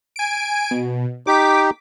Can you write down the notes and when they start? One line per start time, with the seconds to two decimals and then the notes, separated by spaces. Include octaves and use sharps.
0.16 G#5 D7
0.71 B2
1.27 D#4 G4 D6 B6